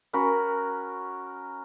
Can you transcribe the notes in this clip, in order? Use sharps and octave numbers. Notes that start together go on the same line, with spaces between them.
C#4 F#4 A#4 B5